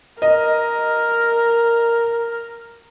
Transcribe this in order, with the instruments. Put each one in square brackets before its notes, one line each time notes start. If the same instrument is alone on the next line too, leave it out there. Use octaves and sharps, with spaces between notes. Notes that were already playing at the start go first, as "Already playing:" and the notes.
[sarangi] A#4 [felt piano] D#5